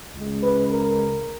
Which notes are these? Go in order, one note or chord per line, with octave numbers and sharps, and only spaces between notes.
C#2 C#3 G#3
B4
A#4